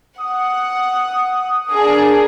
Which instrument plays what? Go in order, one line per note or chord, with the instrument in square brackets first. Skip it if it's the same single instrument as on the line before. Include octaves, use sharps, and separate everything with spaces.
[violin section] F#5 [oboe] D#6
[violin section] D4 G#4 A#4